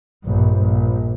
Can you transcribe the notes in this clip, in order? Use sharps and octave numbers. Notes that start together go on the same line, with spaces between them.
A#1 G2
A#1